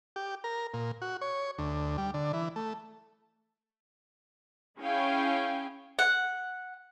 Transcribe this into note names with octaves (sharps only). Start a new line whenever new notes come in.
G4
A#4
A#2
F#4
C#5
D2
G3
D3
E3
A3
C#4 E4 G#4 C#5 F5 G5
F#5